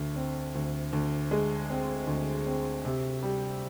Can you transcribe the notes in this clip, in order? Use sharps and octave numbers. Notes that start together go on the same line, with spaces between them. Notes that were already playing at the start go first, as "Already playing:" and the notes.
Already playing: D2
C4
D2
D2
G#3
C4
D2
C4
C3
G3